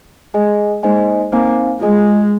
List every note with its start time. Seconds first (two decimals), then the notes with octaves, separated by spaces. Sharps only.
0.34 G#3 G#4 D#5 G#5
0.83 G#3 A#3 D#4 C5 D#5 G#5
1.32 A#3 C4 D#4 C5 F5 G#5
1.81 G#3 F4 G#4 D#5 G#5